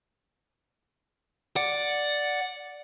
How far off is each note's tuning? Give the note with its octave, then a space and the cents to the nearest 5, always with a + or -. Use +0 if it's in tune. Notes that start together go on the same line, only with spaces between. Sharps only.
D5 +0 F#5 -5